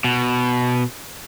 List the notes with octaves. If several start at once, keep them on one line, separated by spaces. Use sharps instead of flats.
B2